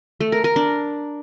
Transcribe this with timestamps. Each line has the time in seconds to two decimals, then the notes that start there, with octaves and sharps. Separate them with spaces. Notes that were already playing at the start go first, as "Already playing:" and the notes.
0.20 A3
0.32 A#4
0.44 A#4
0.56 D4